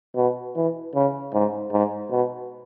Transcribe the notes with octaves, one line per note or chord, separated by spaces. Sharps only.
B2
E3
C#3
G#2
G#2
B2